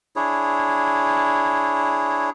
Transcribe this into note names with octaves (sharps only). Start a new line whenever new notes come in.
D4 E4 G#4 C#5